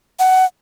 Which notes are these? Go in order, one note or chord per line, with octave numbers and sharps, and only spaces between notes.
F#5